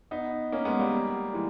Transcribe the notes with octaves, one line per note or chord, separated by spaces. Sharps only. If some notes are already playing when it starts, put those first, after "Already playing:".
B3 D#4
A#3 C#4
G#3 B3
G3 A#3
E3 G#3